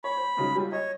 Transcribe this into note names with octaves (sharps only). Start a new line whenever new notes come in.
C#5 B5
C5
G#2 C#3 F#3
F#3 G3 F4
C#5 D#5